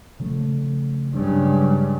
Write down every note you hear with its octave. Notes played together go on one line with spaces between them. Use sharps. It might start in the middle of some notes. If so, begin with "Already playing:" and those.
C#3 F3 A3
G2 C#3 F#3 G#3 D4